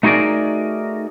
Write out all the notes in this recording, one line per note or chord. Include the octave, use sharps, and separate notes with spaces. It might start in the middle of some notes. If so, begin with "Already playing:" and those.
A3 D#4 F#4 G#4 A#4 D5